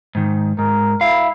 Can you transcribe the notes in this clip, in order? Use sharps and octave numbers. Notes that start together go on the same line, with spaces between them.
G#2 D#3
G#2 A#4
E4 F5